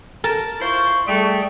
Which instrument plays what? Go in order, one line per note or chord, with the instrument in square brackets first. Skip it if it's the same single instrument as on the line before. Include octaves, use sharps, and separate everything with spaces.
[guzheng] A#4 A5
[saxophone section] E4 F4 C5 [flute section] C#6
[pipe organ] G3 G#4 G5 [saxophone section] A3